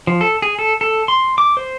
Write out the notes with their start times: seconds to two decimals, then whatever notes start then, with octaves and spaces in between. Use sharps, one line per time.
0.07 F3
0.21 A4
0.42 G#4
0.59 A4
0.81 A4
1.08 C6
1.38 D6
1.57 C5